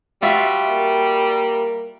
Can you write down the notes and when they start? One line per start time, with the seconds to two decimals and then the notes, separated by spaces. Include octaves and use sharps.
0.22 G3 F4 F#4 E5
0.69 A#3 A#4